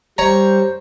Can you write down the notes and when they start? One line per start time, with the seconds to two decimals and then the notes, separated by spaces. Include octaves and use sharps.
0.18 G3 C5 C#5 A#5